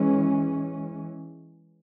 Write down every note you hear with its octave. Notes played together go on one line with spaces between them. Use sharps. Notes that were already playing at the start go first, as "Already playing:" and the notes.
Already playing: E3 G#3 C#4